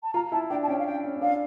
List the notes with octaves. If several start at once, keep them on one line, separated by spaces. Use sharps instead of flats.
A5
F4 A#5
E4 A5
D4 G5
A5
C#4 G5
F5
G5
C#4
C#4
D4 F5